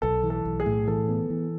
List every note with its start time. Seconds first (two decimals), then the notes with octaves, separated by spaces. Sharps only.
0.02 B1 A4
0.23 E3
0.30 A4
0.45 B1
0.60 G#4
0.66 A2
0.87 E3 A4
1.09 B3
1.30 E3